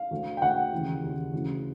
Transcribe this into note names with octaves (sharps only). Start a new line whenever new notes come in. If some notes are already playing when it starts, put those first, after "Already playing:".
Already playing: F5
D2 D3
G5
D2 D3 F#5
D#2 C#3 E3
D#2 C#3 E3
D2 C#3 E3